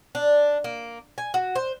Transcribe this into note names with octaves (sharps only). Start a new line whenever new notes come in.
D4
A#3
G#5
F#4
C5